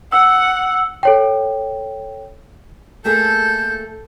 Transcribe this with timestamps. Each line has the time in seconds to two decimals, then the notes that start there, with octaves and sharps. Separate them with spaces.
0.12 F#5 E6
1.03 A4 C#5 G5
3.05 A3 A#3 G#4 A4 G6